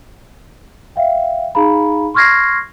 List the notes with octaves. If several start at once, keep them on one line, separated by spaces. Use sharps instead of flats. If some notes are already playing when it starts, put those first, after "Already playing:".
E5 F5 G5
D#4 G#4 F5 A#5 B5
C6 C#6 F6 G#6 A#6 C7